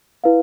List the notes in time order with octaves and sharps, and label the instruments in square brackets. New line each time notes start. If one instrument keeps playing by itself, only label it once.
[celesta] E4 B4 F5